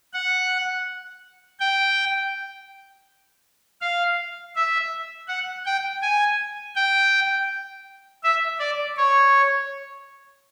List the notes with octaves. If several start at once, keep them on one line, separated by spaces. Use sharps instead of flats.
F#5
G5
F5
E5
F#5
G5
G#5
G5
E5
D5
C#5